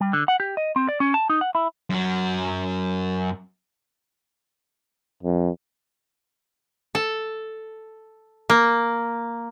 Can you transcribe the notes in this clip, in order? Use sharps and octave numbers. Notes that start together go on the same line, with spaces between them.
G3
D3
F#5
G4
D#5
C4
D5
C#4
A5
D#4
F#5
E4
F#2 F#3
F2
A4
A#3